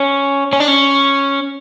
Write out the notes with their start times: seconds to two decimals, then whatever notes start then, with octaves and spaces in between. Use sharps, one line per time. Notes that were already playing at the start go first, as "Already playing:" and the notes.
Already playing: C#4
0.53 C#4
0.60 D4
0.68 C#4